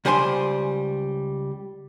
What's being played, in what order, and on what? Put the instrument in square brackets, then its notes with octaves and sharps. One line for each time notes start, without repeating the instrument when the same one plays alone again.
[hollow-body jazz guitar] C#2 G3 C5 G#5 A5 C6